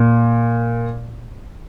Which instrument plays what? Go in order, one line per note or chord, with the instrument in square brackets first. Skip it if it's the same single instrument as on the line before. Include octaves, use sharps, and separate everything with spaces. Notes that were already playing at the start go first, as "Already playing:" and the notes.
Already playing: [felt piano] A#2